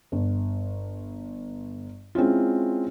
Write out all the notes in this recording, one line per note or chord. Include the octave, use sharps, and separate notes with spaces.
G1
G#3 C4 C#4 E4 F4